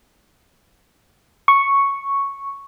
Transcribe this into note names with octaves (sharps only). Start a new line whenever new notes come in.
C#6